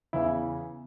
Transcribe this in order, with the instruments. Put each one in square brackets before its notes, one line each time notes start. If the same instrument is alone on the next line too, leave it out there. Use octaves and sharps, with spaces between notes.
[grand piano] E2 C#3 E3 E4